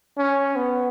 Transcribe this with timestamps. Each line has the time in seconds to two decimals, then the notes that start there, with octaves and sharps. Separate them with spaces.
0.17 C#4
0.56 B3